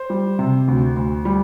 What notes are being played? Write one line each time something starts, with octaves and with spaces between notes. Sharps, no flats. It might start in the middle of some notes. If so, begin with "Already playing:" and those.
Already playing: C5
G3
C3
D2
D2
G3